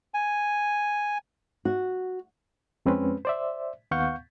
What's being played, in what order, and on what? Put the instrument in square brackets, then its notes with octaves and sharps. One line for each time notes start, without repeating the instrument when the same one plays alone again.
[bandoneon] G#5
[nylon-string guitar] F#4
[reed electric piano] F2 G#3 C4 C#4 B4
C5 D5 E5
D#2 B3 F5 F#5 C#6 G6